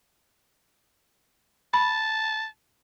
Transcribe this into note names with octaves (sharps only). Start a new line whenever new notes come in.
A5 B5